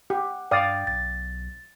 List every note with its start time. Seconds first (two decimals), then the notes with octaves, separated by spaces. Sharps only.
0.10 G4 F#5
0.51 G2 D5 F5 G5 D#6 A6
0.87 B1 A6